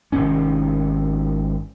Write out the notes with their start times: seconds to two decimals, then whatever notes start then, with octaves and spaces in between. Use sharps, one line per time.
0.12 G#1 C3 D#3 C#4